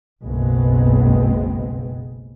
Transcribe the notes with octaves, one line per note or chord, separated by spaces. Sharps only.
F#1 B1 G#3 B3 C4